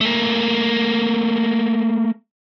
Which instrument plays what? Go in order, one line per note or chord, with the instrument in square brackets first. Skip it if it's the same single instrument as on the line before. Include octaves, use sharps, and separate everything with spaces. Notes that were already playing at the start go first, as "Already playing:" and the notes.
[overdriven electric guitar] A3 A#3